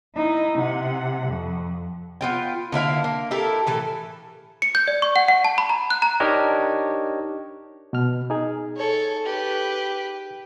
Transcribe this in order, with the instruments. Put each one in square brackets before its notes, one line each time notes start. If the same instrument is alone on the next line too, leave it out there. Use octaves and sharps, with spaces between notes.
[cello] D#4 E4
C3 F#5
F2
[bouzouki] B3 F4 G5
D3 A#3 E4 F5
A#3
E4 G4 A4 A#4
A2 E3 A4
[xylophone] C#7
G6
D5
C#6
F#5
F#5
A5
B5
A#5
F#6
A#5
[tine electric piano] D4 D#4 G4 A#4 C#5 D#5
[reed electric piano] B2 F6
D#4 G#4
[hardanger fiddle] A4 C#5
G4 B4